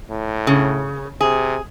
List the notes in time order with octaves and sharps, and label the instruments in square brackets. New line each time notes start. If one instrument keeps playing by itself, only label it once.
[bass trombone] A2
[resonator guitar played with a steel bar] C#3
[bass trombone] C3 [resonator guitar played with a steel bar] G#4